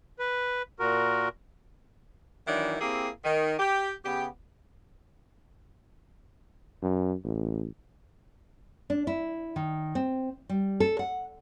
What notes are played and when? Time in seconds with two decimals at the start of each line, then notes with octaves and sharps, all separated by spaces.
0.19 B4
0.80 A#2 F#4 A#4
2.47 D#3 E3 F#3 D4 E4
2.80 A#3 C4 E4 G4 G#4
3.25 D#3
3.58 G4
4.05 C#3 B3 G4
6.82 F#2
7.24 A1
8.90 D4
9.07 E4
9.56 D#3
9.95 C4
10.49 G3
10.80 A4
10.99 F#5